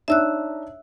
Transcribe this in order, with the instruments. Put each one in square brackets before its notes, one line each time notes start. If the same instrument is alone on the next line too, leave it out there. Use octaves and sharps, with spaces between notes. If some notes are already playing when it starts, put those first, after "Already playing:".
[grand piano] D4 D#4 C#5 [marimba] E5 E6 F#6